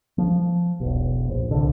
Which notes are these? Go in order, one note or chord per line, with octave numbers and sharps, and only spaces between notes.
F3
E1 B1
A#1
C2 D3